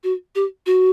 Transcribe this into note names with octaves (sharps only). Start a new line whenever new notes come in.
F#4
G4
F#4